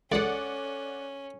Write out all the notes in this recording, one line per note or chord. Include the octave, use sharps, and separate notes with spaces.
C#2 G#3 C#4 A4 D5 F#5